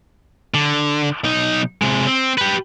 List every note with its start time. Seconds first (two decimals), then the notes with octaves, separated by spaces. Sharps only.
0.54 D3
1.24 B1 D#4
1.82 C3 G#3
2.07 C4
2.38 G4 B4